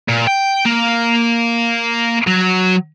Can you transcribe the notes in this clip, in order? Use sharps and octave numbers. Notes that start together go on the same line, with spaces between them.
A#2
G5
A#3
F#3